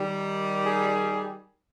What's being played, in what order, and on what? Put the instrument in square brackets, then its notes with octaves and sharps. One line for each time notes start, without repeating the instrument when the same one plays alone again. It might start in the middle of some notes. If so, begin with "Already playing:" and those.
Already playing: [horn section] D#3 G3
[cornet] G#4